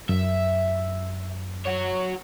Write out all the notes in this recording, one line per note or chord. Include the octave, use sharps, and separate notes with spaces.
F#2 E5
F#4 C#5